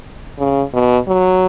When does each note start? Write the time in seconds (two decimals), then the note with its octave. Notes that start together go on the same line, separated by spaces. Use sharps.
0.39 C#3
0.74 B2
1.08 F#3